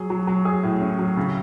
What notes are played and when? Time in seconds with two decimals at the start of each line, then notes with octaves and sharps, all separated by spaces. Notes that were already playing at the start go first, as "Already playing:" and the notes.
Already playing: F#3 G#4
0.10 F#3
0.27 F#3
0.45 G#4
0.63 A2
0.81 C#4
0.99 F#3
1.17 C#3